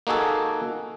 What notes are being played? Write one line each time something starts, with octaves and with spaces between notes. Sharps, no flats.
A#3 D#4 F#4 G#4 A4